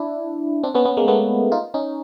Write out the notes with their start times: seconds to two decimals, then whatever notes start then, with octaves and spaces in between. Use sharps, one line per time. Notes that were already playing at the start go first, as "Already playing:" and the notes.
Already playing: D4 E4
0.63 C4 D4
0.74 B3 C#4
0.85 B3 C#4
0.97 G#3 A#3
1.08 A3 B3
1.52 D#4 F4
1.74 C#4 D#4